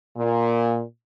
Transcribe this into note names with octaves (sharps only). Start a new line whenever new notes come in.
A#2